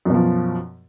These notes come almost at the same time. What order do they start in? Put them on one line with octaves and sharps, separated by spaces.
F#2 B2 F3